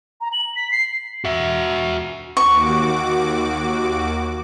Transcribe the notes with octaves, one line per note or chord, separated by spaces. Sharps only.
A#5
F#7
B6
C7
F#4 E5
D#2 F#4 C#6 D6